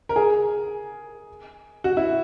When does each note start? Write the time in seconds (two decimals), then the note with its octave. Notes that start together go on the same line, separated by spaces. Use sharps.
0.09 A#4
0.16 G#4
1.84 F#4
1.97 E4